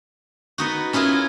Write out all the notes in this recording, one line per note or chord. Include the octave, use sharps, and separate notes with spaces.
B3 D#4 F#4
C#4 E4 F4 G#4 A#4